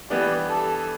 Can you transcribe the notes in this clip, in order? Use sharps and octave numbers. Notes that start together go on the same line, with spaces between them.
E3 G3 B3 D4 G4
A4